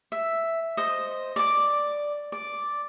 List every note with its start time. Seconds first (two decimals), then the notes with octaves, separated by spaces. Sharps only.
0.12 E5
0.77 C5 D#5
1.36 D5 D6
2.32 D5